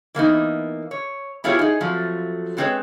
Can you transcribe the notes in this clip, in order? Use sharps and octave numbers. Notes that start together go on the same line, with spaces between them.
E3 A#3 B3 D#4
C#5
B3 E4 F4 G4 G#4 C#5
D#4 G#4
F3 F#3 A3 C4
F#3 G#3 C4 G#4 B4 C#5